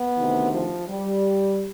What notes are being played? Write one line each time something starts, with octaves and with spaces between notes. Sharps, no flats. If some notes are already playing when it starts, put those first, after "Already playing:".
Already playing: B3
D2 C3 D#3
F3
G3